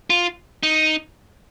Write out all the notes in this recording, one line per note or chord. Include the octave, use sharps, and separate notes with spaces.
F4
D#4